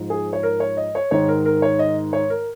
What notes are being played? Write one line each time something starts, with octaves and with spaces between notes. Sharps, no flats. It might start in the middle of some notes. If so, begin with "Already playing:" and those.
Already playing: G#2 F3
G#4
C#5
A#4
C#5
D#5
C#5
G#2 D#3 C#5
A#4
A#4
C#5
D#5
C#5
A#4